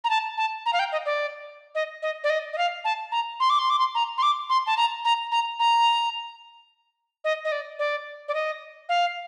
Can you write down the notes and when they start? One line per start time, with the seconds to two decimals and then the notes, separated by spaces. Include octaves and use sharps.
0.04 A#5
0.10 A5
0.37 A5
0.66 A#5
0.73 F5
0.79 G5
0.92 D#5
1.06 D5
1.75 D#5
2.02 D#5
2.24 D5
2.30 D#5
2.53 D#5
2.58 F5
2.84 A5
3.12 A#5
3.40 C6
3.50 D6
3.59 C6
3.70 D6
3.79 C6
3.95 A#5
4.18 C6
4.22 D6
4.49 C6
4.66 A5
4.77 A#5
5.05 A#5
5.31 A#5
5.59 A#5
7.24 D#5
7.45 D#5
7.52 D5
7.79 D5
8.28 D5
8.34 D#5
8.89 F5